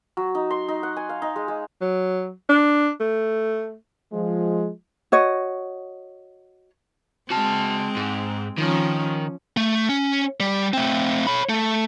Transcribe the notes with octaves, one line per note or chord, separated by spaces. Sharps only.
F#3
D#4
C6
D#4
F#5
G#5
F5
D#4
G#3
G#3
F#3
D4
A3
F3 G#3
F#4 C#5 D#5
G#3 C4 F#4 A5
G#2
D#3 F3 C#4
A3
C#4
G3
A3 C4
C#5 B5
A3